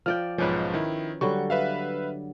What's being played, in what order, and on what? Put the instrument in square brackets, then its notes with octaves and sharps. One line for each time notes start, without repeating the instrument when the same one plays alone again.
[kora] F3 D5 G5 [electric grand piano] F6
[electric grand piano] B1 G#2 F3 [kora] C#4 B4
[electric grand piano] D#3 E4
[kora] D3 F#3 G3 [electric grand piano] C#6
[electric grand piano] B4 E5 F5